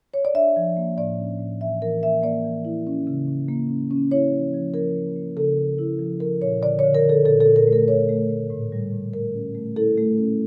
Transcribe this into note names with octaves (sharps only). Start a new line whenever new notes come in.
C#5
D5
D4 E5
F3
A#3
A2 D5
C#4
A2
E3 E5
E3 A#4
A#3 E5
A#3 D5
E3
E4
C#4
C#3
C#4
A#3
C#4
C#4
E4 C#5
F3
F3
F3 A#4
A#3
A#3
C#3 A4
C#3
E4
F3
F3 A#4
A#2 C#5
D3 D5
D3 C#5
A#4
D3
A4
A#2 A4
A4
A#2
A#4
A3
A#4
A3 C#5
A3
A3
A2
G3
A2
A3 A#4
C#4
A3
E4 A4
A3
C#4